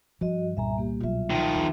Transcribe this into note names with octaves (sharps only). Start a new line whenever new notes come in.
G2 F3 F#4 D#5
C2 A#2 G3 E5 G#5 A#5
A#3 G4
B2 F#3 F4 E5
D#3 F3
E2